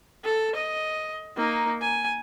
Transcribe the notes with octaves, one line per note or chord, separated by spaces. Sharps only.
A4
D#5
A#3 D#4
G#5